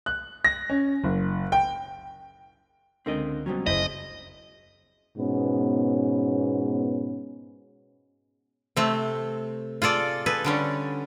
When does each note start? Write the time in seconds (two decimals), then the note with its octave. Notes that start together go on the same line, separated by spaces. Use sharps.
0.06 F#6
0.44 A#6
0.70 C#4
1.04 F#1
1.52 G5
3.06 C#2 D3 C4 A#4 D#5
3.46 B2 F#3 G3 C4 C#4
3.67 F#1 E4 C5 D#5
5.18 G#2 B2 B3 C#4
8.76 C3 A3 C4
9.82 F4 G#4 A4 D5
10.26 G#4 A4 B4
10.44 D3 G3 C#4